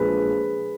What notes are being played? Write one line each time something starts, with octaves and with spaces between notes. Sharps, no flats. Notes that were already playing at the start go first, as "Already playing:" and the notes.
Already playing: A#1 A#2 F3 G#3 G#4 B4